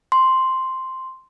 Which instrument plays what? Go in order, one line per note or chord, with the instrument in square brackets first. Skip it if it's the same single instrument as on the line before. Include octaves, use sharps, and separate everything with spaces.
[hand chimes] C6